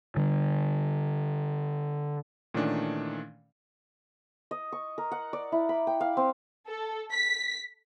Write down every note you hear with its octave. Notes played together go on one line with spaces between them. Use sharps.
D3 G3
A#2 D#3 E3 A3 C#4 D4
D#5
C#6
A#4
F#5
D5
E4
B5
G5
F5
C4
A4
B6